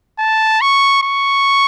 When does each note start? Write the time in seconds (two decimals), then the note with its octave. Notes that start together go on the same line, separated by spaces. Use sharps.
0.19 A5
0.61 C#6
1.03 C#6